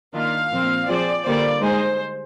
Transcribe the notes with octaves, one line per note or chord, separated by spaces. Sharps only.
D#3 A#3 D4 F4 F5
A#2 F3 C4
F3 C4 F4 G#4 C5 D5
D3 G3 A#3 F4 C5 D5
G#3 D#4 G#4 C5